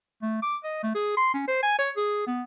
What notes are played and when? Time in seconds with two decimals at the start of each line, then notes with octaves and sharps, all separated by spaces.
0.22 A3
0.42 D6
0.64 D#5
0.83 A3
0.95 G#4
1.17 C6
1.34 C#4
1.48 C5
1.63 G#5
1.79 C#5
1.97 G#4
2.27 B3